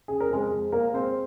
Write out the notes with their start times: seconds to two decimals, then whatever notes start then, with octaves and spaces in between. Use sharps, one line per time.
0.08 C#3 G#4
0.20 A#4
0.30 F2 G#3 G#4
0.51 G#3
0.72 G#3 A#3 A#4
0.94 G#3 C4 C5